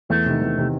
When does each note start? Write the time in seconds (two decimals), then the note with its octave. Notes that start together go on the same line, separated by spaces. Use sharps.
0.10 E2 A3
0.26 C3 D#3
0.41 E2
0.56 C3 D#3